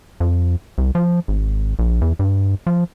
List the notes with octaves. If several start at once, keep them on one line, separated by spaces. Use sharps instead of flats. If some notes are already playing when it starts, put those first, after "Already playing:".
F2
C2
F3
G#1
A#1
E2
G2
F3